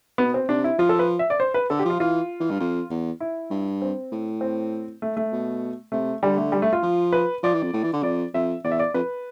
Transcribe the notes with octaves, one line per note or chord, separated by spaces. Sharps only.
B2 B3
C4
C3 D4
E4
F3 F4
A4
B4
E5
D5
C5
B4
D3 A4
G4
F3 F4
E3 F4
E3
G2
F2
E2
E4
G2
C4
A2
C4
A3
A3
B2
C3 A3
D3 G3
A3
G3
A3
F4
F3
B4
F3 D5
E3
F2
A2
E3
D3
F2 D5
F2 E5
E2 D5
E5
D5
F2 B4